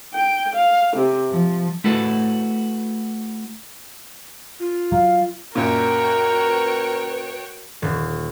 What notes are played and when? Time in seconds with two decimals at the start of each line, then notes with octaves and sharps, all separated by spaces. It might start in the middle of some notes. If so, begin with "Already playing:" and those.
0.13 G5
0.54 F5
0.96 C3
1.30 F3
1.84 A3 E4 F#4 A4 B4
4.60 F4
4.92 F#3 F5
5.55 F#2 A#2 F#4 A#4 C#5 G5
6.45 B4
7.82 D#1